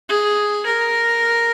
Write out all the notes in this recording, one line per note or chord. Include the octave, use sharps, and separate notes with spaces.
G#4
A#4